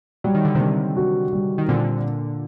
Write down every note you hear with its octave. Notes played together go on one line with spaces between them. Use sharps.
F#3 G3
D#3
D3
C3 D#3 G3
F#4
G3
D#3
A#2 D3 C4